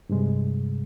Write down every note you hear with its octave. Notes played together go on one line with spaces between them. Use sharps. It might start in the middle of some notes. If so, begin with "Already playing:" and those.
G2 C3 G#3